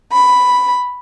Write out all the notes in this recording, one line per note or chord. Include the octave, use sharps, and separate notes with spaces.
B5